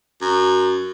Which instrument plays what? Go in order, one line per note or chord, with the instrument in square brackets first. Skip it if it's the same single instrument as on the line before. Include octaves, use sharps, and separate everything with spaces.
[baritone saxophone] F#2